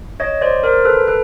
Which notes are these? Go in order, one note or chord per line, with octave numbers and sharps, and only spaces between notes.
C#5 D#5
C5 D5
A#4 C5
A4 B4
A4 B4